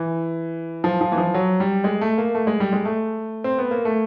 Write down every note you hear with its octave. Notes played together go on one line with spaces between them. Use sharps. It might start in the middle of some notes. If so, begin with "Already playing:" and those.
Already playing: E3
F3
F3
E3
F3
F#3
G3
G#3
A3
A#3
A3
G#3
G3
G#3
A3
C4
B3
A#3
A3